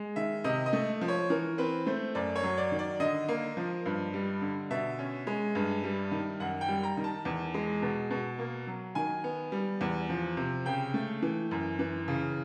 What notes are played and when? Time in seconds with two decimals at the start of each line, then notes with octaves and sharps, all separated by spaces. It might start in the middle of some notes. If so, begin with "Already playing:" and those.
Already playing: G#3
0.16 D#3 E5
0.44 C3 D#5
0.66 D#5
0.73 A3
1.01 F3
1.08 C#5
1.30 E3 A#4
1.58 C4 B4
1.87 A3 C5
2.15 F#2 D5
2.36 C#5
2.43 F#3
2.58 D5
2.72 D#3
2.79 D5
3.00 D3 D#5
3.28 A#3
3.57 F3
3.86 G2
4.14 G3
4.42 D3
4.71 B2 E5
4.99 C#4
5.27 G#3
5.55 G2
5.84 G3
6.12 D#3
6.40 F#2 F#5
6.61 G5
6.68 G3
6.83 A#5
6.97 D#3
7.04 A5
7.25 E2
7.54 G#3
7.82 B2
8.11 B2
8.39 A#3
8.67 F#3
8.95 D#3 G#5
9.24 B3
9.52 G3
9.81 E2
10.09 F3
10.37 C3
10.66 C#3 G5
10.94 A3
11.22 E3
11.51 F#2
11.79 E3
12.08 C#3